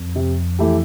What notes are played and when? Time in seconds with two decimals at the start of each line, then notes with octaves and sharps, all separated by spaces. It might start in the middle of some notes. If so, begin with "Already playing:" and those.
Already playing: F2
0.16 C3
0.59 E3 A3 E4 G4